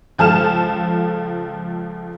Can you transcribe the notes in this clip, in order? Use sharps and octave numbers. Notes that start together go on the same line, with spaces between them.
C#2 F3 A4 A5 F6 E7